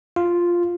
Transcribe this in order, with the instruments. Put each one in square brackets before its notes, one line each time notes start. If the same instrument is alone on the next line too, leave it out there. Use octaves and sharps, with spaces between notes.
[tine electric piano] F4